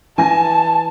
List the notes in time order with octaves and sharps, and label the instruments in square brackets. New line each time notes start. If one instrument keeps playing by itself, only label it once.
[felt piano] E3 A#6 [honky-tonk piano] G#5 [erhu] A5